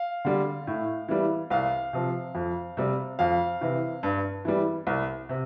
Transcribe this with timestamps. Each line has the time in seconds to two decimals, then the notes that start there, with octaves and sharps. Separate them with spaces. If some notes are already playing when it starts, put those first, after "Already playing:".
Already playing: F5
0.25 D3 G3
0.67 A2
1.08 E3 G3
1.50 C2 F5
1.93 C3 F3
2.35 F2
2.77 C3 G3
3.19 F2 F5
3.61 C3 E3
4.03 G2
4.45 E3 G3
4.87 C2
5.29 C3